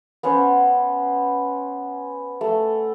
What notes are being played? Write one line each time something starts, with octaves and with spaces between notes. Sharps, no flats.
B3 C#4 C5 F#5
A3